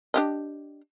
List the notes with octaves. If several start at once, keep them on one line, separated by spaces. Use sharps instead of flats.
D4 G4 D#5